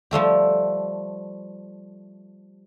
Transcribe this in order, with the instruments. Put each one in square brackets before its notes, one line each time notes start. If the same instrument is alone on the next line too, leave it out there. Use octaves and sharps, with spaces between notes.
[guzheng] F3 G3 A3 G4